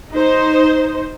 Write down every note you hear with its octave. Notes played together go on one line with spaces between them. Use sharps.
D#4 C5